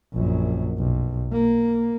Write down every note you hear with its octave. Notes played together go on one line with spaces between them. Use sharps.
A#1 F#2
B1
A#3